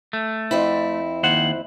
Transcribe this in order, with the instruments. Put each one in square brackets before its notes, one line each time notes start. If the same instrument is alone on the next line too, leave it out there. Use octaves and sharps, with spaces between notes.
[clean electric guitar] A3
[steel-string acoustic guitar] F2 C4 E4
[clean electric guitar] D#2 C5 F#5